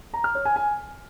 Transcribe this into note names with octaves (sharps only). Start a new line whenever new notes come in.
A#5
F6
C#5
G#5
G#5